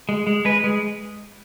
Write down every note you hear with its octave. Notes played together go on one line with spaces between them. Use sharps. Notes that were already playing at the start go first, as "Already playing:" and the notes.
G#3
G#3
G#3 B4
G#3